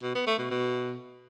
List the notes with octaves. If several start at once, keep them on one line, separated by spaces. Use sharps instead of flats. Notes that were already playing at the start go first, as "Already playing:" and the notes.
B2
B3
A3
B2
B2